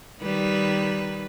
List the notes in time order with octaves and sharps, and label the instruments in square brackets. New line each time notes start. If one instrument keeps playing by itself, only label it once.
[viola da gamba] D#3 G3 B4